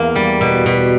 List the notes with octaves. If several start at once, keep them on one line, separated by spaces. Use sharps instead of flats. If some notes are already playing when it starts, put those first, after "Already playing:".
Already playing: E2 A#3
G3
B2
B2